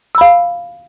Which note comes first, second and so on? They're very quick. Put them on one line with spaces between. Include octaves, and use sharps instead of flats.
E6 B5 F5